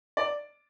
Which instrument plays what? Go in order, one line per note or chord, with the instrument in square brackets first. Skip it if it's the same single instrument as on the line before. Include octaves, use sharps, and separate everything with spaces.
[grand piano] D5